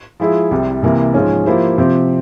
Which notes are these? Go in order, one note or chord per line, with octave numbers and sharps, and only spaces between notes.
F3 G#3 E4 G#4 E5
C2 C3 G3
C2 C3 E3 A#3
G#2 F3 G#3 C#4
F3 A#3 E4 G4 C5
C3 F3 C4 G4 C5